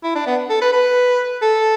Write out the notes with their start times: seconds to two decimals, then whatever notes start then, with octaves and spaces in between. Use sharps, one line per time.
0.04 E4
0.15 D4
0.27 B3
0.50 A4
0.61 B4
0.73 B4
1.42 A4